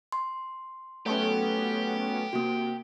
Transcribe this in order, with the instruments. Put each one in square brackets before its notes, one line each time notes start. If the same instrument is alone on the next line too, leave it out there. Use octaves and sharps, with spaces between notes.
[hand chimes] C6
[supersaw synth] F#3 B3 C#4 [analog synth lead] A3 [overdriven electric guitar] G4
[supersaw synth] C3 [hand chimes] A#3 F#4